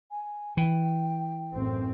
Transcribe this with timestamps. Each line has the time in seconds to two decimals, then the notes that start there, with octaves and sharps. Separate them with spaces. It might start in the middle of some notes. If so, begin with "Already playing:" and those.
0.11 G#5
0.57 E3 G5
1.52 A1 F#2 C4